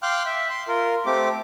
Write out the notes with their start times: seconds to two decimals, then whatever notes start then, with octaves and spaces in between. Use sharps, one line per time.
0.03 F5 G5 C6 D6 F6 F#6
0.26 E5
0.50 C6
0.68 F4 A#4
1.06 A3 C4 G4 D6